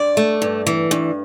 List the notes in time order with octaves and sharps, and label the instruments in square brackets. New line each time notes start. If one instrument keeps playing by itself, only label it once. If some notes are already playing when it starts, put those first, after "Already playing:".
Already playing: [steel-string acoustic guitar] G2 D5
A3
G2
E3
G2